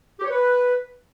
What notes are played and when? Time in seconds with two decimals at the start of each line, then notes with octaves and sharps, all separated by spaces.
0.20 G4
0.25 C#5
0.30 B4